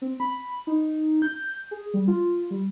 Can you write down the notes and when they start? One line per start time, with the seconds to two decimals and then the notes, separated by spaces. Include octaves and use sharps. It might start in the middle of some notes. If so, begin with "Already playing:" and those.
0.02 C4
0.20 B5
0.67 D#4
1.22 G6
1.71 G#4
1.94 G3
2.08 F4
2.51 G3